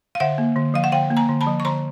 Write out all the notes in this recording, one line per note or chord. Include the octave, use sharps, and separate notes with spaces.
F5
D3 E5 F#5
A#3
D3
F3 F5
F#5
D3 F5 G5
A#3
G#5 A#5
D3
A5 B5
F3
C#6
D3 A#5 C6